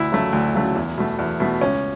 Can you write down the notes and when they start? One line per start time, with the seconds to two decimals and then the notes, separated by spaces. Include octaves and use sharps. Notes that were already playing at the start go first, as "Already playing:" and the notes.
Already playing: D2 E4
0.12 C#3 F#3 A3
0.32 D2
0.54 C#3 F#3 A3
0.75 E2
0.98 B2 A3
1.19 E2
1.40 B2 A3
1.61 C#2 C#4